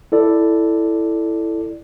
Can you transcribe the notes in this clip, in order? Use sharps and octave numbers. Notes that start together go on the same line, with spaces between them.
E4 A4 D5